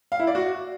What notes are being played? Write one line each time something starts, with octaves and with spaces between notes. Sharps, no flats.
F5
E4
D5
F#4